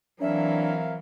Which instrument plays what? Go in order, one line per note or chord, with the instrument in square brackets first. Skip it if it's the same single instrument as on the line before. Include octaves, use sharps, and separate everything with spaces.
[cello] E3 F#3 [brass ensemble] C4 A#4 F5 [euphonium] D4 [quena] E5